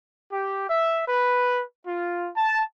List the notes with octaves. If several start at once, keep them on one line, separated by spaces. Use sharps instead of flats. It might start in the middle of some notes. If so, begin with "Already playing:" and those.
G4
E5
B4
F4
A5